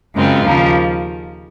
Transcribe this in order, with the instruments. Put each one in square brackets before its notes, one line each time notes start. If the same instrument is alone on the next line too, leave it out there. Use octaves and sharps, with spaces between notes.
[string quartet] F#2 C#3 G#3 C4 F4
D#2 C#3 F3 A#3